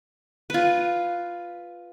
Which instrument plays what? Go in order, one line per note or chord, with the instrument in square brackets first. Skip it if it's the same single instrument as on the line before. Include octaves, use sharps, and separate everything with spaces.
[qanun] F4 B4